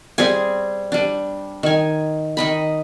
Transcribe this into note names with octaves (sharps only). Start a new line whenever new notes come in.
G3 C4 G#4 G#5
G3 D4
D#3 G#5
D#3 D#5 B5